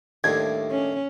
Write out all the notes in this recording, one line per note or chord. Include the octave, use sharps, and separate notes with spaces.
D#2 A2 G3 A3 D4 G#6
C#4